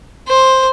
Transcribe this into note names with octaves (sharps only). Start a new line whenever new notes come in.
C5